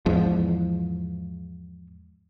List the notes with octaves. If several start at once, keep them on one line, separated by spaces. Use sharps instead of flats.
E2 G#2 F3